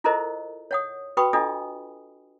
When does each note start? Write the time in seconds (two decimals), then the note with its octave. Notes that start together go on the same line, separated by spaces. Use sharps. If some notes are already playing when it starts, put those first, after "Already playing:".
0.04 E4 F4 A4 A#4 C5 D#5
0.71 C#5 F#5 D#6
1.17 F#4 B4 G5 B5 C#6 D#6
1.33 D4 F4 A4 D#5 G#5 D#6